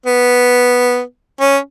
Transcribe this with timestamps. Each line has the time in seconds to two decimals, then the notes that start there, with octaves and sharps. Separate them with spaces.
0.06 B3
1.41 C#4